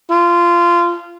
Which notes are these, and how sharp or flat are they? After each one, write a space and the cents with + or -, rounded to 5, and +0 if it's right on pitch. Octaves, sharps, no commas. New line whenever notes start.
F4 -20